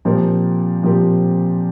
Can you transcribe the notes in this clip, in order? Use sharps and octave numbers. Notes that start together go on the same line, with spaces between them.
A#2 F3 C4 G4 A#4
A#2 F3 C4 G4 A#4